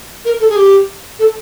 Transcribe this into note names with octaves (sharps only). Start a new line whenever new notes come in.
A#4
A4
G#4
G4
A4